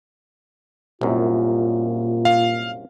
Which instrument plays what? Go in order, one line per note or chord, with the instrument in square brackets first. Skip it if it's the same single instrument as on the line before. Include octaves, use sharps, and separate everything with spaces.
[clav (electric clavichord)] C2 F#2 [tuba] A#2 [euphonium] F4
[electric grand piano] F5